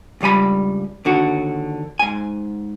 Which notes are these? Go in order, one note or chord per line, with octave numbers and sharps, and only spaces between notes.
C#2 G2 G3 G#5 B5
D#2 D3 F#4
G#2 G#5